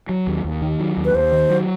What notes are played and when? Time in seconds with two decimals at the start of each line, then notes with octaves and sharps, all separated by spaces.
0.09 F#3
0.27 D#2
0.44 D#2
0.62 D#3
0.80 F#3
0.97 D#2
1.05 B4
1.14 D#2 C5
1.32 D#3
1.50 F#3